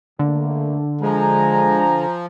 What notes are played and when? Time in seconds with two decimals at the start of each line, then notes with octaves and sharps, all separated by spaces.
0.19 C#2 D3 A3 A#3
1.02 F3 G#3 G#5 A#5